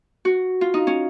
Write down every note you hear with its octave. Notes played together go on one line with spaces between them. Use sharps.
F#4
F4
D#4
C#4